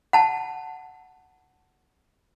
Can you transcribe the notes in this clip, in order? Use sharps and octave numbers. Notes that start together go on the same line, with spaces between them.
F#5 A5